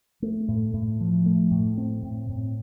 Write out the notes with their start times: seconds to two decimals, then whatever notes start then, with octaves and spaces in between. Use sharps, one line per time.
0.22 A3
0.48 A2
0.74 A2
1.01 F3
1.26 A3
1.51 A2
1.78 C4
2.03 A2
2.29 A2